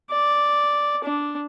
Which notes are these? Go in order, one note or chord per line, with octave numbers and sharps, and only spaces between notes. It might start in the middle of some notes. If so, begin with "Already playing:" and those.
D5
D4